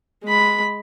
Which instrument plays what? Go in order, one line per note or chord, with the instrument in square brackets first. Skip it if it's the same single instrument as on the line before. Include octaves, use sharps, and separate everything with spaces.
[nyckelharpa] G#3 B5